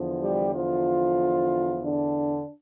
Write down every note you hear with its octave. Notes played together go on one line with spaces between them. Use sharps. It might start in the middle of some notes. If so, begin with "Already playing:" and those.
Already playing: E2 D3 F3
G3 G4
F3 F4
D3 D4